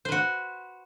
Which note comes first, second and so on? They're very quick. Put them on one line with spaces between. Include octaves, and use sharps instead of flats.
C5 B4 F#4